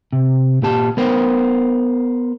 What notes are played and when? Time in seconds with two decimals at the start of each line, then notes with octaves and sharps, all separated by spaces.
0.13 C3
0.62 A#2 G4 A5
0.97 B3 A#4 C5 G5